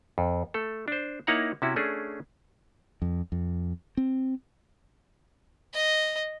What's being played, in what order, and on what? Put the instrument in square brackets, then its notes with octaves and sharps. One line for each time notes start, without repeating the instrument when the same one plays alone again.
[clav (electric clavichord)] F2
A3 A4
D4 C5
A#3 D#4 E4 C#5 F#5 A#5
C3 C#4 E4 F#4
A3 C#4 D4 G#4 A4
[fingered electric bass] F2
F2
C4
[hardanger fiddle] D#5